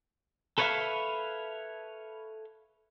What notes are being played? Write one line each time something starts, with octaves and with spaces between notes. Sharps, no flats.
A4 B4 C#5 D5 E5 F5